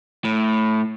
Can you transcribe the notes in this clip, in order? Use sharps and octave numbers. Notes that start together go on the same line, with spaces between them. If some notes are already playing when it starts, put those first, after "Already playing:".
A2